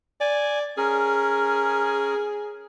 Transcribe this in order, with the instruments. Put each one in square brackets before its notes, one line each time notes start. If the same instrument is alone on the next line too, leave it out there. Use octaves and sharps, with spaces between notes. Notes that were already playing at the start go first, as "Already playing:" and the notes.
[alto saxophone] D5 [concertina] G#5
[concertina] C#4 A#4 [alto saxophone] G#4